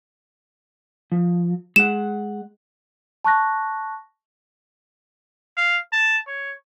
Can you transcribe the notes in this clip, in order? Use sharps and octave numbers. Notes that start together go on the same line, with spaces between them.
F3
G#3 F#5 E7
A5 C#6 F#6 A#6
F5
A5
C#5